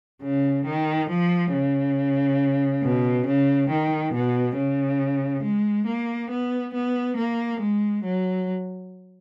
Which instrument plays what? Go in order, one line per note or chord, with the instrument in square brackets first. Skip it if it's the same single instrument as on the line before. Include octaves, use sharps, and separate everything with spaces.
[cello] C#3
D#3
F3
C#3
B2
C#3
D#3
B2
C#3
G#3
A#3
B3
B3
A#3
G#3
F#3